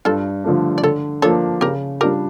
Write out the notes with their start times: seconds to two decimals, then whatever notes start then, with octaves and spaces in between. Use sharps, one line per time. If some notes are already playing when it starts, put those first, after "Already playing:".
0.05 G2 F4 A4
0.44 D3 F3 A3 D4
0.78 D5
0.83 D3 A4 C#5
1.22 F3 A#3 D4 A4 C#5
1.61 C#3 G4 A#4
2.01 G3 D4 F4 G4 A#4